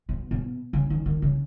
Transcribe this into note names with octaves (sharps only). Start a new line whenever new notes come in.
B2
B2
C#3
D#3
D#3
C#3